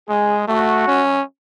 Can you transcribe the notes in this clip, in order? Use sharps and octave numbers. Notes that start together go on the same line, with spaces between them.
G#3 G#4
A3 F#4
C#4